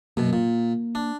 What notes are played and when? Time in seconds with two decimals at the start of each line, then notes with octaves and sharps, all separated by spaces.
0.17 F#2 B2 A#3
0.33 A#2
0.95 D4